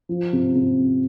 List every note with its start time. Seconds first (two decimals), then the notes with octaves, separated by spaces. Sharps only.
0.09 F3
0.33 C3
0.55 C3